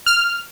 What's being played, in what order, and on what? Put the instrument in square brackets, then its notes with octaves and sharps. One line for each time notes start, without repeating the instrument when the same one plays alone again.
[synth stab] F6